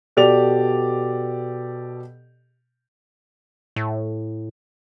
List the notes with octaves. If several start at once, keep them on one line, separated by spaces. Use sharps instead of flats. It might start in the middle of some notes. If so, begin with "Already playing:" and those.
B2 G4 A4 D5 F7
A2